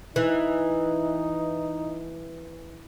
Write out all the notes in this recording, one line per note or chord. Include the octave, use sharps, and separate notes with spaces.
E3 D#4